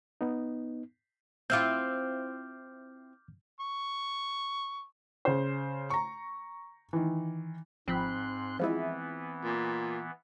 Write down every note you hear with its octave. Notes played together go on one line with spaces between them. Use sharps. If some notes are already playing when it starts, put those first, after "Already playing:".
B3 D#4
C4 E4 F4 D6 F6 G6
C#6
C#3 C5
A#5 C#6
D#3 E3
G#1 G#2 F3 C4 B5 C6 F#6
E3 F3 G#3 B3 E4
A#2